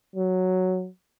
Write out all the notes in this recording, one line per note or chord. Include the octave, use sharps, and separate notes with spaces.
F#3